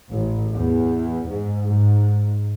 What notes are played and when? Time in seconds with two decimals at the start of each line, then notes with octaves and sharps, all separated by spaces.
0.10 A1
0.53 E2
1.28 G#2
1.68 G#2